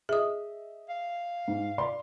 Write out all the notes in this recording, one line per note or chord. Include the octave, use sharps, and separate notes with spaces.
G#4 D#5 E5 D#6
F5
G#2
D5 B5 C6